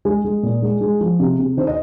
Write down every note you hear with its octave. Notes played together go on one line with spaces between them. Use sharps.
G#3 G#4
G#3
A#2
G#3
G#3
F3
C3
C3
D#3 C5
D#5